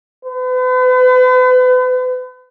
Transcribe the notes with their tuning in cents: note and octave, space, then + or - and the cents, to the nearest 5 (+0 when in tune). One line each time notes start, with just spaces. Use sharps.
B4 +40